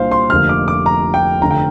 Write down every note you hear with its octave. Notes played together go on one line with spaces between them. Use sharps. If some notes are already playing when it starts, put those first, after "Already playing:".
Already playing: C2 A#2 A#3 D4 C5 F5
C6
F1 F2 D3 A#3 F6
D6
D6
A#5
G5
F1 F2 D3 A#5
G5